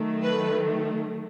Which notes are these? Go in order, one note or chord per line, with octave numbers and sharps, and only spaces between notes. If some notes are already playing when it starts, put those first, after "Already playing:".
Already playing: D#3 F#3 A3
B4